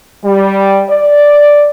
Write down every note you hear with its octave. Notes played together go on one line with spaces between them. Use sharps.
G3
D5